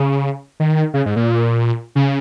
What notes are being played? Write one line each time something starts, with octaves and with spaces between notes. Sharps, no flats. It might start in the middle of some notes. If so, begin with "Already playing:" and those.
Already playing: C#3
D#3
C#3
G#2
A#2
C#3